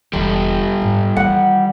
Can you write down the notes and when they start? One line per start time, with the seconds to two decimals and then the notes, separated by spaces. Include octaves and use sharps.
0.13 E1 E3 G3 G4 A4
0.82 G#2
1.17 D#3 E3 F#5